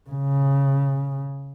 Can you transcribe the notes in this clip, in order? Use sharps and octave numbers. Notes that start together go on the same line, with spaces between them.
C#3